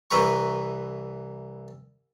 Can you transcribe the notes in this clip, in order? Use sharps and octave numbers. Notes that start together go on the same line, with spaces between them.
C2 E3 A#4 B4 A#5 C#6